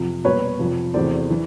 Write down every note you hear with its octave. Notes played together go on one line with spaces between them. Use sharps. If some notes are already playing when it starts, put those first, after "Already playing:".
Already playing: F2 C3 F3
B2 G3 A#3 B4 C#5
F2 C3 F3
E2 C3 E3 A3 C5 D5
E3